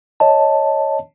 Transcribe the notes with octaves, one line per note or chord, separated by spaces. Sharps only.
C#5 D#5 A5